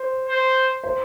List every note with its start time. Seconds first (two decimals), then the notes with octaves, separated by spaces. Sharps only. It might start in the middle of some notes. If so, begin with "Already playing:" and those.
Already playing: C5
0.29 C5
0.84 C5